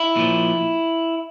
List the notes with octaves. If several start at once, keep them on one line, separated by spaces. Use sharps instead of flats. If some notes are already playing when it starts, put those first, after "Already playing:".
Already playing: E4
A#2 F3